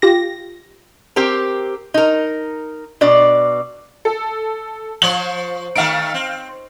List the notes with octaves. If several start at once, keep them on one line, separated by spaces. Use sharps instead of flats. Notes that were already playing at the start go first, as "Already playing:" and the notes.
F4 G4 A#6
C4 G4 A#4
D#4 A#4
B2 D4 D5
A4
F3 C5 C#5 F#7
D#3 A3 D#4 F5 D7
C4